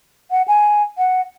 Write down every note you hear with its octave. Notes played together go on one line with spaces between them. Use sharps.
F#5
G#5
F#5